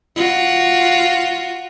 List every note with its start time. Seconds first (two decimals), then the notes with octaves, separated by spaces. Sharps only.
0.16 F4 F#4